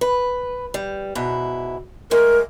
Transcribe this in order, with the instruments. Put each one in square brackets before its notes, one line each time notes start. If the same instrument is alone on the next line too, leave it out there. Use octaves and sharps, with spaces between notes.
[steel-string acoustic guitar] B4
G3
G#2 B2 E4
[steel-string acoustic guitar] G#3 A3 [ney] A#4